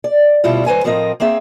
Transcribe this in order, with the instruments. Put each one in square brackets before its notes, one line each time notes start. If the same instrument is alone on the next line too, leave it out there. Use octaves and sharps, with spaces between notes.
[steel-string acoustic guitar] D5
D2 B2 G3 E4 F4
D2 F#3 B4 C5 G#5
A2 F3 C4 A#4 D#5
A#3 C4 G#4 E5